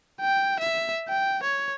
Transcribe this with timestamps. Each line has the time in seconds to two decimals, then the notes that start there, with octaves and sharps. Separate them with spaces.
0.21 G5
0.59 E5
1.08 G5
1.43 C#5